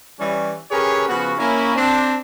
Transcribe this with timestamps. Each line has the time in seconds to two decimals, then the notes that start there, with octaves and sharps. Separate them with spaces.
0.19 E3 G3 C#4
0.70 C#4 G4 G#4 A#4 B4 C#5
1.08 C#3 F3 B3 F#4
1.39 A#3 C#4 E4
1.76 C4 D4